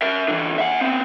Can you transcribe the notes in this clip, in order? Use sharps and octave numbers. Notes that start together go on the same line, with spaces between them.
A#4 E5
D3 E3
E5 F#5
B3 C4